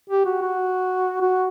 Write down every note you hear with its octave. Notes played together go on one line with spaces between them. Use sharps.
G4
F#4
F#4
F#4